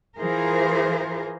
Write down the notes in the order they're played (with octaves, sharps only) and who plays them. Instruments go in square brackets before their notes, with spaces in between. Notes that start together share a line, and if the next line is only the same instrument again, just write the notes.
[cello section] E3 F4 G#4 A#4 C5